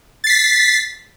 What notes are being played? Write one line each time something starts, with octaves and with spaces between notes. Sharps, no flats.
A6 B6 C7